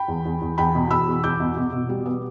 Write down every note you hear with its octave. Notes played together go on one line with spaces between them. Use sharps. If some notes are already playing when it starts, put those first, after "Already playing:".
Already playing: G5 B5
E2
E2
E2
E2 G5 B5
B2
E2 B5 E6
E2
E2 D6 G6
B2
B2
B2
G3
B3